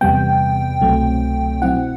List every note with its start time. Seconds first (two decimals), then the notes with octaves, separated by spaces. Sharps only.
0.01 E2 C3 G3 B3 G5
0.81 C2 B2 F#3 A3 C4
1.62 B2 F#3 C4 E4 F#5